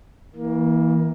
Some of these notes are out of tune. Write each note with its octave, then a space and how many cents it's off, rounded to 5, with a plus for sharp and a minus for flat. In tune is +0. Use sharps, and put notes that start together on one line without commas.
E3 -25 A#3 +15